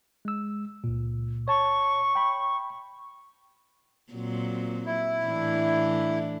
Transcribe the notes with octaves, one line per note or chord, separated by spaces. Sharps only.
G#3 E6
C#2 A#2
C#5 A5 C#6
G5 B5
A#2 F#3 C4
E4
A2 E3 D4